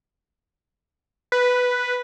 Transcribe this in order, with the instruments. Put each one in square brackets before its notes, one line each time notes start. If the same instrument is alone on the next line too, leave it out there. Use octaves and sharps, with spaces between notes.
[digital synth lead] B4